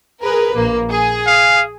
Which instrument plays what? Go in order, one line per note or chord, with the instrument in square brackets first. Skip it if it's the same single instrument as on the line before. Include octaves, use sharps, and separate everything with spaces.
[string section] G#4 A#4 B4
A#1 A#3
G#4
[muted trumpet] F5